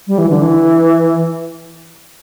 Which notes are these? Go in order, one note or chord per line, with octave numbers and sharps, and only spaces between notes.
G3
E3
D3
E3